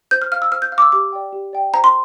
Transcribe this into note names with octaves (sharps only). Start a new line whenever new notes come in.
C5 G6
F6
F5 F6
E6
C5 F6
G6
F5 F6
D6
E6
G4 D6
D5 G5
G4
D5 G5
C5 A#5
C6